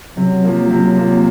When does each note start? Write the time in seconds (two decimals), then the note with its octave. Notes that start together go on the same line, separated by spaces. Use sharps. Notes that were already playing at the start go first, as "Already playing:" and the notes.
0.17 C3 F#3
0.44 F3 A#3
0.70 C3 F#3
0.97 F3 A#3